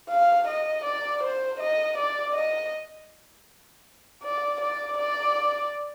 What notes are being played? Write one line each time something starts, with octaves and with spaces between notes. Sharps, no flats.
F5
D#5
D5
C5
D#5
D5
D#5
D5
D5
D5